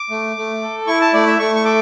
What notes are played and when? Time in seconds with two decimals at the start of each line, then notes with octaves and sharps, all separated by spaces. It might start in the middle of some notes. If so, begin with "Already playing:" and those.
Already playing: D6
0.10 A3
0.36 A3
0.61 A4
0.87 E4 C#6
1.01 A5
1.13 A3 D5
1.27 E5
1.39 A3 C#6
1.56 C#6
1.64 A4 D6